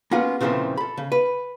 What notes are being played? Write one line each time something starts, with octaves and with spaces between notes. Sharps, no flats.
A#3 B3 C#4 F4 F#4 G#4
A#2 C#3 E3 F3 A3 C4
A4 B5
C#3
B4